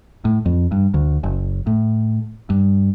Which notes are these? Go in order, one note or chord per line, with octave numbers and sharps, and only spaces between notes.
A2
F2
G2
D2
F#1
A2
G2